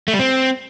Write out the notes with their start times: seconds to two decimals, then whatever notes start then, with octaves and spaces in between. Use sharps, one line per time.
0.08 A3
0.14 G3
0.19 C4